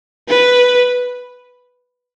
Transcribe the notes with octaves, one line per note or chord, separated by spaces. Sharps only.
B4